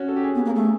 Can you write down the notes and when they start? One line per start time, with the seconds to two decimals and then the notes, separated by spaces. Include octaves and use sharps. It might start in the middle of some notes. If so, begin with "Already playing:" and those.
Already playing: C#4 F#4
0.08 A4
0.16 G4
0.24 G#4
0.35 B3
0.45 A#3
0.55 A3 G#4